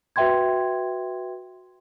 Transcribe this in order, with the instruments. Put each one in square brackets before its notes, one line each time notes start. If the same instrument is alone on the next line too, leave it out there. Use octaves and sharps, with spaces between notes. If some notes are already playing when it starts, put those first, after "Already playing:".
[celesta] F#4 B4 E5 G5 C6 G#6